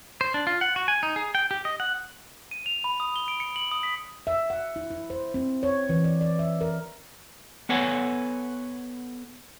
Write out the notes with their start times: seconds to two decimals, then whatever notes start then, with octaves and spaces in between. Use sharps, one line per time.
0.21 C5
0.34 D4
0.47 F4
0.61 F#5
0.76 F#4
0.88 G#5
1.03 D#4
1.16 G#4
1.35 G5
1.51 G4
1.65 D#5
1.80 F#5
2.51 D#7
2.66 F7
2.84 B5
3.00 D#6
3.16 G7
3.28 D7
3.40 C#7
3.56 F#7
3.72 D#6
3.83 B6
4.27 E5
4.50 F#5
4.76 E4
4.91 E4
5.10 C5
5.34 C4
5.63 C#5
5.89 E3
6.04 D5
6.21 D5
6.39 E5
6.61 A#4
7.69 B3 A4 B4 C#5 F#5 G#5